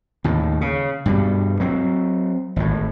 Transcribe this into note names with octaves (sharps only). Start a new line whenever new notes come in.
D#2 A2
C#3
G2 B2 G3
F#3 C4
G#1 A2